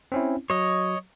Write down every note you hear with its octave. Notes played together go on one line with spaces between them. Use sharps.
C4 C#4 E4
F#3 C#5 D#5